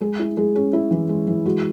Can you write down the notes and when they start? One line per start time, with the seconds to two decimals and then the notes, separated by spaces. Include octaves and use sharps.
0.01 G#3 G#4
0.19 E4
0.37 G#3 G#4
0.55 C#4 G#4
0.73 E4
0.91 E3
1.09 G#3
1.27 E3
1.46 G#3 F#4